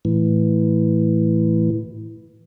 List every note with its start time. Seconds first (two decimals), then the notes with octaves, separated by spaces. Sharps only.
0.05 A2 E3